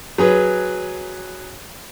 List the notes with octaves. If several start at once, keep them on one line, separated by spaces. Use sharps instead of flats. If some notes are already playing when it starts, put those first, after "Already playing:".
F#3 G#4 B4